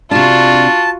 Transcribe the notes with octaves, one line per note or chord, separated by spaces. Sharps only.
C3 D4 F4 F#4 A5